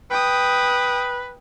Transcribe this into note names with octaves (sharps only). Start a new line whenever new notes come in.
B4 G5 D#6